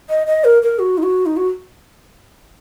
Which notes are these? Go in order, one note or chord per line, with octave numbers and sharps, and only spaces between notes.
D#5
D#5
A#4
A#4
F#4
D#4
F#4
D#4
F#4